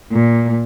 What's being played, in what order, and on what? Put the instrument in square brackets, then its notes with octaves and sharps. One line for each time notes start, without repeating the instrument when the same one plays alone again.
[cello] A#2